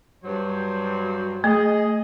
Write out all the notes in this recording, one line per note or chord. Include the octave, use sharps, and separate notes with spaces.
G2 F#3 C5
A3 G#4 D#5